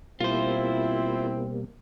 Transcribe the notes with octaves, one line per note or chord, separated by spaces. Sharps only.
B2 G3 A#3 C4 E4 F4 C5